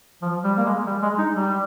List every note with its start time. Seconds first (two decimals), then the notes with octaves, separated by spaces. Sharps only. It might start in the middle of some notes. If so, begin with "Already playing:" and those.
0.22 F3
0.44 G3
0.57 A#3
0.65 G#3
0.87 G3
1.02 G#3
1.18 D#4
1.35 G3